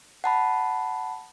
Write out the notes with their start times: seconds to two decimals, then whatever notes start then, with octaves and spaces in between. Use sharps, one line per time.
0.24 F#5 A5 B5